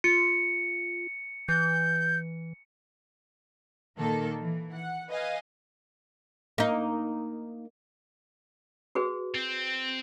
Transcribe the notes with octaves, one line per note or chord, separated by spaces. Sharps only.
F4 C#7
E3 G6
A#2 D#3 A#3 A4
E3
F#5
B4 D#5 F5 G#5
A#3 D#4
F#4 G#4 B4
C4